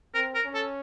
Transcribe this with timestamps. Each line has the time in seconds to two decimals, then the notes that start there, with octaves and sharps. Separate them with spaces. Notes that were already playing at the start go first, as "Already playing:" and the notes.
0.14 C4 A#4
0.35 A#4
0.45 C#4
0.54 A4